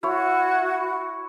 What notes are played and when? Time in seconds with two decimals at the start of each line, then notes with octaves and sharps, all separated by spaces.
0.03 E4 F#4 C#5